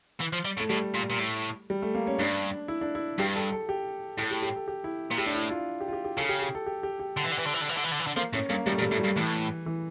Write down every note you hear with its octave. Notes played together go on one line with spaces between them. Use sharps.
E3
F3
G3
A2 A3
A2 G3
A#2
A#2
A2
G3
A3
A#3
C#4
G2 D4
E4
D4
E4
G2 G4
A4
A4
G4
A2 A4
G4
G4
A4
G4
E4
A#2
A2 G4
D4
E4
F4
G4
F4
G4
G4
C#3 A4
G4
G4
A4
G4
G4
G4
D3
E3
D3
E3
D3
E3
D3
E3
D3
E3
D3
E3
D3
F3 A#3
A2 C#4
G2 A#3
A2 G3
A3
A#2
G3
A2 A3
G3
G2
A2 E3
E3